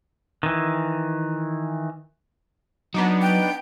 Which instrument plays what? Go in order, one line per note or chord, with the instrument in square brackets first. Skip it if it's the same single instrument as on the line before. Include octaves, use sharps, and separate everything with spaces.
[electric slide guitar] D#3 E3
[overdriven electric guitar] F#3 [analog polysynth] B3 D4 D#4
[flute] G5